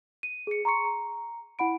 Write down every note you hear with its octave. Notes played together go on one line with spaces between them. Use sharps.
D#7
G#4 C#7
A#5 C6 C#6 C#7
A#5
E4 F#5 B5 D7